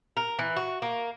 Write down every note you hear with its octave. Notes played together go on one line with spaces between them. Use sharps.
A#4
E3
F#4
A#3